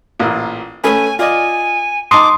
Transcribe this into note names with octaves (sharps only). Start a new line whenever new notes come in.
A1 A#2
A3 C#4 B4 G#5
F4 D5 D#5 G#5
D#4 A5 A#5 C6 D6 D#6